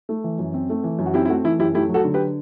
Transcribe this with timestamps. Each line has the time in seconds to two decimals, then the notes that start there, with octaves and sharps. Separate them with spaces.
0.09 A3
0.24 E3
0.39 F#2
0.54 C4
0.70 A3
0.84 E3
0.99 F#2
1.06 F#4
1.14 C4 E4 G4
1.25 E4
1.29 A3 F#4
1.44 E3 E4
1.59 F#2 E4 G4
1.74 A3 E4 G4
1.89 F#3
1.94 F#4 A4
2.04 D3
2.14 G4 B4